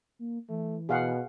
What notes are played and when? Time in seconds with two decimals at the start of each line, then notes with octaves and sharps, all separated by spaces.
0.19 A#3
0.49 E3 A3
0.89 B2 G#4 F5 F#5